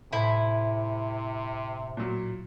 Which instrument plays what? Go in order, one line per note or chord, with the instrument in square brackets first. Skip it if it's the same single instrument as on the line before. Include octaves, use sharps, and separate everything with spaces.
[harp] A2 C5 [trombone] C3 [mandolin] E4
[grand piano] A#2 F#3